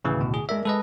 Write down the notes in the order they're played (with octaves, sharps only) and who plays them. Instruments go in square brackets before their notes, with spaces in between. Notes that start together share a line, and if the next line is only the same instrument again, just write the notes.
[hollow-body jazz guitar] D2 A2 [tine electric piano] C#3 E3
[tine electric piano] B2
G#4
[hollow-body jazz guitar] G#3 A#4 D5 [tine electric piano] E5
[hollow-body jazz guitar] G#3 [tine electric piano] A4 B4 D#5